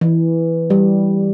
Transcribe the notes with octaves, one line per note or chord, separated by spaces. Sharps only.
E3
G3